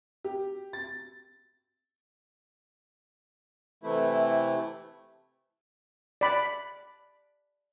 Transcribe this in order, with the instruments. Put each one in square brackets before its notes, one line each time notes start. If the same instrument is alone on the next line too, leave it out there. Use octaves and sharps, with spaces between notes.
[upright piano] G4
A6
[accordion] C3 E3 A3 E4
[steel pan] D5 B5